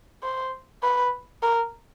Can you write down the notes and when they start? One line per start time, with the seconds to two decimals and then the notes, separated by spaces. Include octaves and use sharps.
0.23 C5
0.83 B4
1.43 A#4